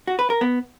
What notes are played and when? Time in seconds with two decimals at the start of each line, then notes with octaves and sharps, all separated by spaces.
0.07 F#4
0.19 B4
0.30 A#4
0.41 B3